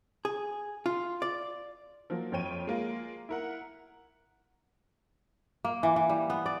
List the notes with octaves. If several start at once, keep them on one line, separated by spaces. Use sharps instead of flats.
G#4
F4
D5
F3 F#3 A#3
F2 F3 C#5 G5 D#7
G#3 A#3 F4
E4 A#4 F#5
A#3
E3
E3
G3
B3
D5